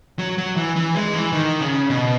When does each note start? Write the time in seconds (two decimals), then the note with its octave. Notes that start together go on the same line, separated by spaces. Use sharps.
0.19 F#3
0.38 F#3
0.57 E3
0.76 E3
0.95 G#3
1.14 E3
1.33 D#3
1.60 C#3
1.90 B2